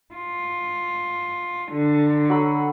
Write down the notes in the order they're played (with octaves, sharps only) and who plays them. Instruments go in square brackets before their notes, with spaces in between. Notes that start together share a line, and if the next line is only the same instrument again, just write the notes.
[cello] F4
D3
[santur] F#3 A4 B5